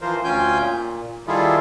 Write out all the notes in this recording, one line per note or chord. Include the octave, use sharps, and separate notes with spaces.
E3 F3 F4 A#4 C5
D2 C#4 F4 G5 G#5 G6
A#2
D#3 G3 E4 F4 G#4 A4